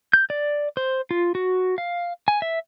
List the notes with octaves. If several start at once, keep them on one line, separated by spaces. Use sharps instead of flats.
G6
D5
C5
F4
F#4
F5
G#5
E5